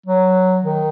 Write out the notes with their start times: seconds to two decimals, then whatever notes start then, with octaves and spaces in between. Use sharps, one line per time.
0.06 F#3
0.64 D#3